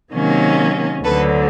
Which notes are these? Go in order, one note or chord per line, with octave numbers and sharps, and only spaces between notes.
C3 D#3 F#3 A#3 C#4
D2 D3 F#3 A4 B4